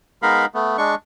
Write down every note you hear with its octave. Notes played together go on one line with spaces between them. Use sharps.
G#3 B3 D#4 A#4 F5 B5
A3 B3
G#3 D4 C#6